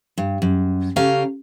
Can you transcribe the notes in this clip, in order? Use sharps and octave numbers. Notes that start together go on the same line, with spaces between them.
G2
F#2
C#3 C#4 G4 A4 F5 A#5